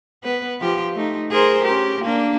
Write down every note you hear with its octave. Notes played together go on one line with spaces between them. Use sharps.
B3 B4
F3 F4 G4
A3 D#4
G#4 A#4 C5
C#4 G4
A#3 D4